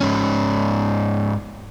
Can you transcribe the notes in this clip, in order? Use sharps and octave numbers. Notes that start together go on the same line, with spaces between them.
G#2 C#4